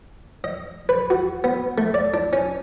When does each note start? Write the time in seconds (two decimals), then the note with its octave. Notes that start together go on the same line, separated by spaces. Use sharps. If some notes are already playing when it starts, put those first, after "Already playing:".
0.44 D#5
0.89 B4
1.10 F#4
1.44 B3
1.78 A3
1.94 D5
2.14 D4
2.33 C#4